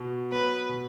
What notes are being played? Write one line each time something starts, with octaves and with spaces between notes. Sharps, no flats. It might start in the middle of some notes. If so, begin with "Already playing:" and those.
Already playing: B2
F#3 B3 B4
B2